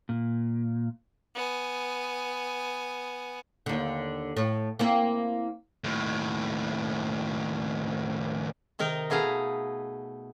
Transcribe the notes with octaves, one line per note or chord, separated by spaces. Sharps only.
A#2
B3 G#5
D#2 D3
A2
A#3 C4 E4
D#2 A2
C3 D#3 D#4 A#4
B2 A3 G#4 B4 F5 A#5